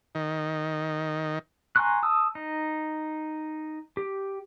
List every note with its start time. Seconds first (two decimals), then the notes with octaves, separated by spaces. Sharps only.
0.15 D#3
1.76 G#5 A#5 C6 C#6 F#6
2.03 A5 D#6 E6
2.35 D#4
3.97 G4